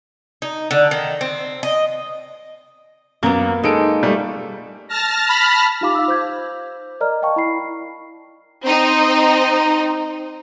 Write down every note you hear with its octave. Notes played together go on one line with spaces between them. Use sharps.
D#4
D3
D#3
C4
D#5
F#2 A#3 B3
G#3 D#4 A4 D7
G3 A3
A5 F6 A#6
B5
D#4 F4 G4 F5 B5 D6
F5 D6 E6
C5 D6 G6 G#6
A#4 D5 D#5 A#5 F6
D#5 F5 G5 A5 C#6
E4 B5 C7
C4 D#4